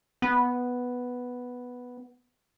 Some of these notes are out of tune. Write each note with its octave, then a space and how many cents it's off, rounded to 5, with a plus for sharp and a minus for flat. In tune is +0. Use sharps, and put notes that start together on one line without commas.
B3 +0